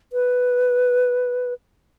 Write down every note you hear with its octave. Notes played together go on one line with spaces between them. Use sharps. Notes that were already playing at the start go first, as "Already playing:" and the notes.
B4